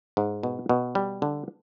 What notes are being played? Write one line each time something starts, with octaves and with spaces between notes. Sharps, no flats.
G#2
B2
B2
G3
D3